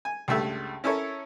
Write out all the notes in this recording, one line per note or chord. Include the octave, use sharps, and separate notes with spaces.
G#5
C#2 G2 A3 E5
C#4 E4 A4 A#4 C#5